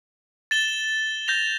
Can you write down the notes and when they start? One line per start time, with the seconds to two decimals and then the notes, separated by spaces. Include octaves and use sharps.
0.51 A6 E7 G7
1.28 G6 A#6 F7